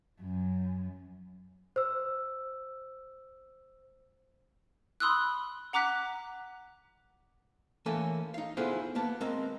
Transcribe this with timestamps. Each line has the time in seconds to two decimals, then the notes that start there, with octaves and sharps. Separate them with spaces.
0.20 F#2
1.76 C5 E6
5.00 B5 C6 D#6 E6 F#6
5.73 F#5 A#5 D6 F#6 B6
7.86 E3 A3 A#3 C#4 A4 G#5
8.34 D#4 F5
8.57 B3 E4 F4 G#4 A4 C5
8.95 A#3 B3 A5
9.21 G#3 C4 A#4